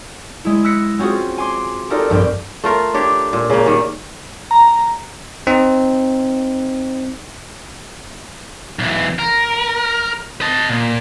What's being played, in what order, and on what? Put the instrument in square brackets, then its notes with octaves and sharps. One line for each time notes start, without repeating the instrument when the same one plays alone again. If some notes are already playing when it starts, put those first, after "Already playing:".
[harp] G#3 E4
E6 F#6 A#6 B6 C#7
C4 C#4 F4 F#4 G#4
G#5 C6 D6 C7
D#4 F4 G4 A4 A#4 D5
A#1 G2 C4 G4
[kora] A3 F4 A#4
D4 G4 C#5
A#2
C#3 A#3
D#3 G3
[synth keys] A#5
[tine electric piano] C4 D#4
[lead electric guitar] B1 E3
A#4
D#5 A5
A#2